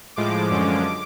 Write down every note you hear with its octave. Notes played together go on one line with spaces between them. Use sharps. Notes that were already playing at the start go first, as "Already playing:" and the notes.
A2 F3 G#3 D6
F#2 D3 F3 G#3 C#4